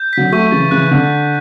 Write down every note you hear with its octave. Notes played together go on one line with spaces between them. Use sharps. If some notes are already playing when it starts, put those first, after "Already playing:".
Already playing: G6
D3 F#3 B6
F#3 A3 C#6
C#3 E3 A6
C#3 E3 F#6
D3 C#6
A6